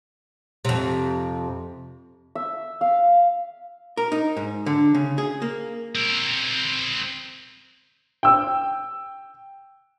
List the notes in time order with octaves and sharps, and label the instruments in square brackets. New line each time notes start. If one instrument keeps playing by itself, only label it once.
[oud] F2 C3
[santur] E5
F5
[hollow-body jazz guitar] A#4
D#4
G#2
D3
C#3
G#4
A#3
[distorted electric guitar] C4 A#4
[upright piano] G5 E6